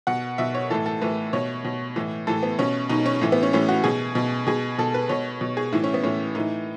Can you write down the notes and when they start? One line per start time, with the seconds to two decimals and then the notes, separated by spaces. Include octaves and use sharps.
0.07 B2 F#5
0.38 B2 E5
0.54 C#5
0.70 A2 E3 A4
0.86 A4
1.01 A2 E3 B4
1.33 B2 C#5
1.64 B2
1.96 A2 E3
2.27 A2 E3 A4
2.43 B3
2.59 B2 C#4
2.89 B2 D#4
3.06 C#4
3.22 A2 E3
3.32 B3
3.43 C#4
3.53 A2 E3 C#4
3.69 F#4
3.84 B2 G#4
4.15 B2
4.47 B2 G#4
4.78 B2 A4
4.94 B4
5.09 B2 C#5
5.41 B2
5.57 G#4
5.73 A2 E3 E4
5.84 C#4
5.94 B3
6.04 A2 E3 C#4
6.35 A2 E3 D#4